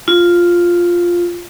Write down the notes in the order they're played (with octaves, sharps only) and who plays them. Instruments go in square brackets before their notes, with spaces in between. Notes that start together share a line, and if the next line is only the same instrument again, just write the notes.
[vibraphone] F4